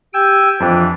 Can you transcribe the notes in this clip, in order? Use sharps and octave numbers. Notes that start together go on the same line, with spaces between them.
G4 G5 G#5 E6
F2 E3 F3 D4 G5